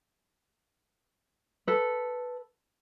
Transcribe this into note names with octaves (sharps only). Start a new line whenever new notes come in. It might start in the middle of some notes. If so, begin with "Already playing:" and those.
A4 B4